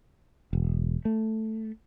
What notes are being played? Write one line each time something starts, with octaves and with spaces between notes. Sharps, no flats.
E1
A3